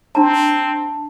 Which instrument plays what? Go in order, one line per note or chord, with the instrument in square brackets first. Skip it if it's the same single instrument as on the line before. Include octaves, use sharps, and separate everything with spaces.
[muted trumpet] C4 [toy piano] D4 A#5 [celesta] A5